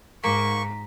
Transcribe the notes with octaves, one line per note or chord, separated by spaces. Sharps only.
G#2 A#3 A#5 C#6 B6